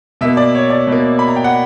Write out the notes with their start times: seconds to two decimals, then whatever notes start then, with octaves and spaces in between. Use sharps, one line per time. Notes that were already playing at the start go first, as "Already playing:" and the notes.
0.21 B2 A#3 E5
0.37 D5
0.55 C#5
0.70 D5
0.87 B2 A#3
1.19 B5
1.28 A#5
1.36 G5
1.44 F#5